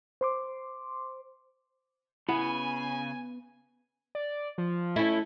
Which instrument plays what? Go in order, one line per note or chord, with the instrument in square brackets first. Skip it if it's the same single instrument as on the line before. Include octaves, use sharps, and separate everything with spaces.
[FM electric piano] C5 C6 D6
[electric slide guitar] C#3 [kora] B3 [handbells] E4 [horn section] G#5
[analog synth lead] D5
F3
[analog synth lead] A3 [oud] C#4 E4